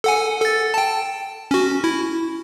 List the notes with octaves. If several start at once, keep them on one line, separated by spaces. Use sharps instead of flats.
A4 F#5 G#5
A4 A6
G5 A5
C#4 F#4
E4